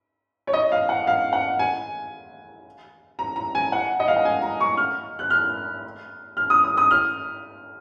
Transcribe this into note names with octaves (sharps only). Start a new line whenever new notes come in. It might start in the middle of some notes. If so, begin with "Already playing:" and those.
C#5
D#5
F5
F#5
F5
F#5
G#5
A#5
A#5
G#5
F#5
D#5
F5
F#5
G#5
A#5
C#6
F6
F#6
F6
F6
D#6
D#6
D#6
F6